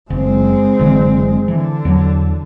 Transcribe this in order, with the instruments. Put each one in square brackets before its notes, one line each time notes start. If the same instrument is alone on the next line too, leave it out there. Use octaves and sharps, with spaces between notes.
[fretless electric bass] F#1 [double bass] G#3 C4
[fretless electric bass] F#1 D3 E3
[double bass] D3 [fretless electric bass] E3
[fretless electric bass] E2 F#3